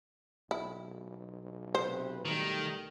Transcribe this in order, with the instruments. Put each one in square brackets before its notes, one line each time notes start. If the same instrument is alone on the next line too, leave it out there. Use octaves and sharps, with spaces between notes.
[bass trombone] B1 [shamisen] E4
[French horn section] C3 B4 [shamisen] C5
[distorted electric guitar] D#3 [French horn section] G3 A3